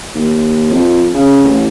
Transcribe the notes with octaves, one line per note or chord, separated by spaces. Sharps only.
D#2
F2
C#3
A1